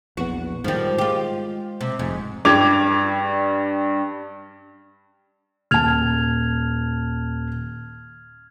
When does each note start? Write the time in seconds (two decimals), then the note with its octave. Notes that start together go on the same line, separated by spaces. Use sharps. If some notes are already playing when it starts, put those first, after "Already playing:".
0.17 A#1 E2 B3 F#4
0.64 G#2 D#3 F3 G3
0.98 G#3 F4 G4
1.81 C3
1.99 F1 G#2
2.45 G2 G3 D6 G#6 F7
5.71 D#1 A5 F6 G#6 F7